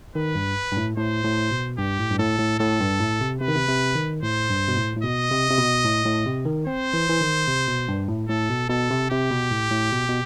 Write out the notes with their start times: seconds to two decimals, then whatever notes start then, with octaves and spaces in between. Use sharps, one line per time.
0.15 D#3 B4
0.35 G2
0.72 G2
0.77 A2
0.96 A2 C5
1.24 A2
1.51 B2
1.78 G2 G4
1.99 A2
2.11 G2
2.19 A2 A4
2.39 A2
2.59 A2 A4
2.80 G2
3.00 A2
3.21 C3
3.41 C3 B4
3.48 D#3
3.56 C3
3.69 C3
3.95 D#3
4.23 A2 C5
4.50 G2
4.68 B2
4.77 A2
4.96 A2
5.03 B2 D#5
5.31 C3
5.50 C3
5.58 B2
5.85 A2
6.05 A2
6.26 C3
6.46 D#3
6.66 C4 C5
6.93 E3
7.09 E3
7.20 D#3
7.48 C3
7.68 B2
7.88 G2
8.09 A2
8.29 A2 A4
8.49 B2
8.69 B2 A4
8.90 C3
9.10 C3 G4
9.31 B2
9.51 A2
9.71 A2
9.92 B2
10.09 B2